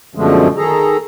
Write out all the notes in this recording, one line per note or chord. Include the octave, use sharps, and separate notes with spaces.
F#2 B2 D3 F3 G#3 A3
D#3 G#4 A4 A#5